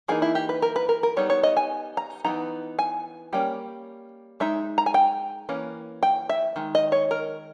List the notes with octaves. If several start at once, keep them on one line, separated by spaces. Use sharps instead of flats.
E3 A#3 D#4 G#4
E4
G4
B4
A#4
B4
A#4
A#4
G3 B3 D#4 C#5
C#5
D#5
G#5
A#5
E3 G#3 B3 D#4 A#5
G#5
G3 A#3 C#4 G5
G#3 D#4 E5
A#5
G#5
G5
E3 A#3 C#4
G5
E5
D#3 G#3
D#5
C#5
A#4